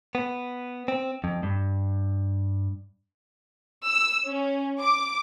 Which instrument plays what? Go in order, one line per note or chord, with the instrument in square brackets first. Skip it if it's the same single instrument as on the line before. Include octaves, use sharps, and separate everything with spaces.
[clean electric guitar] B3
C4
F2
G2
[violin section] E6
C#4
D6